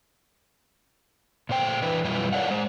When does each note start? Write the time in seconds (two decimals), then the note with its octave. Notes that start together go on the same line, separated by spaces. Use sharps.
1.49 A#2 A3 C5 G5
1.82 E3 D4 B4
2.04 F#2 B2 G3 E4 F4 B4
2.33 A#4 C#5 D5 F5 F#5
2.51 G#3 C5